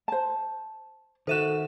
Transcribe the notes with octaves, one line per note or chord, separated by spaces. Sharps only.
C5 A5
D#3 F#4 A4 C5 E5 F#6 D#7 E7